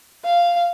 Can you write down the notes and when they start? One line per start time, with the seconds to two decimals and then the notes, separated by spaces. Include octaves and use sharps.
0.24 F5